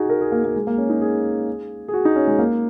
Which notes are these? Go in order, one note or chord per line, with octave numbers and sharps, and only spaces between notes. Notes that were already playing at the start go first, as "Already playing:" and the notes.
Already playing: D#4 F#4 G#4
A#4
G#4
A#3
A#3
G#3
A#3
C#4
D#4
G#4
G#4
F#4
D#4
C#4
G#3
A#3